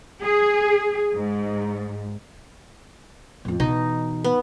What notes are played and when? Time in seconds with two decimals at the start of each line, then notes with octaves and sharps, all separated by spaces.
0.23 G#4
1.14 G#2
3.45 F2 A2
3.60 B2 E3 D#4
4.24 B3